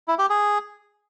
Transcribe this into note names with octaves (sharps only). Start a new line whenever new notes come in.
E4
G4
G#4